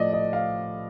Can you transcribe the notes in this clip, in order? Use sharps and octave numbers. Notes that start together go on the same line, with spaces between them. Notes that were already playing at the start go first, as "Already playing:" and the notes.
Already playing: A2 F3 D5 D#5
D#5
F5